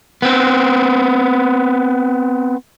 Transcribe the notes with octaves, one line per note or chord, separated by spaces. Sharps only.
B3 C4